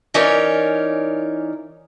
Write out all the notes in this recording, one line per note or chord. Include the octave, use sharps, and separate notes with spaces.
E3 C#4 D#4 A#4 C#5 D5